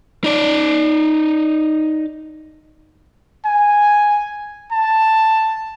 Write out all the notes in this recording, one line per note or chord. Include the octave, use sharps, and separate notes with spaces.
D#4 D5
G#5
A5